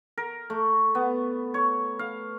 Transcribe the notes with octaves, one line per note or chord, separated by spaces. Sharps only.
A#4
A3
B3
C#5
F5